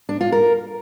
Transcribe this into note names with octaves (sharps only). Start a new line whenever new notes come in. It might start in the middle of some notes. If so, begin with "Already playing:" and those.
D4
F4
A#4